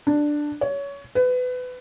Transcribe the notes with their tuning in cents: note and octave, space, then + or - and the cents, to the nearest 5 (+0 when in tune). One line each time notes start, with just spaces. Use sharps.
D4 +5
C#5 +20
B4 +25